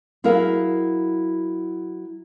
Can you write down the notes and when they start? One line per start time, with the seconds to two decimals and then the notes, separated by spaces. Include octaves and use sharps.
0.24 F#3 E4 G#4 A#4 F5